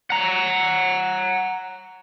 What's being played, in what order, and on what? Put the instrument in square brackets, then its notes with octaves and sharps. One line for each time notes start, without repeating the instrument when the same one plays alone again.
[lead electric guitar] F#5 A#5